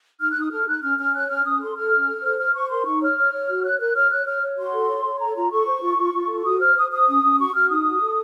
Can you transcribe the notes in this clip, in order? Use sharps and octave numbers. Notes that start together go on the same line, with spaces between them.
D#4 F6
D#4 F#6
D#6
A4 F6
D#4 F#6
C#4 F6
C#4 F6
C#5 F#6
C#4 F6
C#4 D#6
A4 C6
A4 F6
C#4
A4
C5
C5 F6
C5 C#6
A#4 C6
D#4 C#6
C#5 F6
C#5
C#5
F#4
C#5 F#6
A#4 F#6
C#5 F6
C#5 F#6
C#5 F6
C#5
F#4 C6
A4
C#5
C#5
A4 A#5
F4 A#5
A4 C#6
C5
F4
F4
F4
A4
F#4 D#6
C5 F6
C5 D#6
C5 D#6
C#4
C#4
F#4 C#6
F#4 F6
D#4 D#6
F#4
A4